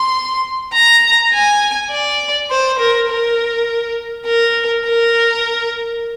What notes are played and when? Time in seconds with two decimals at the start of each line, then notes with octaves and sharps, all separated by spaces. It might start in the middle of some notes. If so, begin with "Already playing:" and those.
Already playing: C6
0.73 A#5
1.33 G#5
1.91 D5
2.51 C5
2.79 A#4
3.09 A#4
4.26 A#4
4.85 A#4